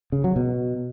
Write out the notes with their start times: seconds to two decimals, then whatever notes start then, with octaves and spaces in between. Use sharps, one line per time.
0.12 C#3
0.24 F#3
0.36 B2